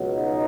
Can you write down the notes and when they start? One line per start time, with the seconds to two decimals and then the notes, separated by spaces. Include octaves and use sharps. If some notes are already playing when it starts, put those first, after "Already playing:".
Already playing: C#2 B2 F#3
0.13 D#4